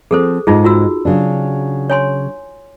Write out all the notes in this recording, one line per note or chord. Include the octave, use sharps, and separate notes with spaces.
F3 C4 G#4 A4 C5
G#2 G#3 D#4 F4 G#4
F4 F#4 E6
C#3 F#3 D4
C#5 G#5 C6